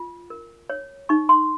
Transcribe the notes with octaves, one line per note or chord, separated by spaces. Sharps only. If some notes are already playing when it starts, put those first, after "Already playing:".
Already playing: F4
A#4
C#5
D#4 C#6
C6